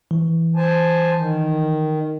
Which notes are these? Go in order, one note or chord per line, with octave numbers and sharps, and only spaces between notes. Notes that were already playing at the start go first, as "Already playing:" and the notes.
E3
C5 G#5 A5
D#3